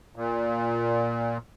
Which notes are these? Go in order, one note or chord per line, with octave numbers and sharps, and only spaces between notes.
A#2